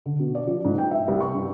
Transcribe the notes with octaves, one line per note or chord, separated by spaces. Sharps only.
D3
B2
D5
F3
G#2
G5
E5
C2
C#6
G2